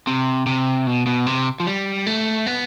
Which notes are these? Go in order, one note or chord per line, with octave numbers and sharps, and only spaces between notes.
C3
C3
B2
B2
C3
F3
G3
A3
B3